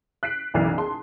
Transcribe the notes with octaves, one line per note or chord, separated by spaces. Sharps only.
F#6 B6 C7 D7
F#1 B1 E3 D5 C7
G#4 A5 C6